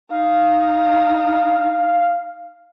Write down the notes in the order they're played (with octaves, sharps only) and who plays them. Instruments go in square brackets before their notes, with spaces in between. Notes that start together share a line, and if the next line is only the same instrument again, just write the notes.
[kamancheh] D#4 [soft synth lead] F5